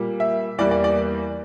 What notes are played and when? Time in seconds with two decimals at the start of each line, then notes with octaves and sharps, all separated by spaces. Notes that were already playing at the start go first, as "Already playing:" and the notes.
Already playing: A#2 G3 A#3
0.20 E5
0.58 E2 E3 G3 A#3 D5
0.71 D5
0.84 D5